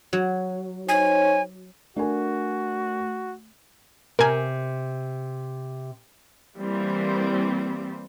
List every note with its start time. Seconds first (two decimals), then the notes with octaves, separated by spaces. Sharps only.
0.13 F#3
0.89 D#4 C5 C#5 G#5
1.96 A3 D4 F#4 A#4 G#5
4.19 C3 A#4 G#5
6.59 E3 G3 A#3 C4 C5